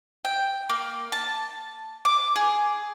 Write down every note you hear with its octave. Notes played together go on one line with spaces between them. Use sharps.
G5
A#3
A5
D6
G#4